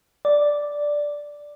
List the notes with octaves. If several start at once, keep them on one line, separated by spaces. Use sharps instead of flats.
D5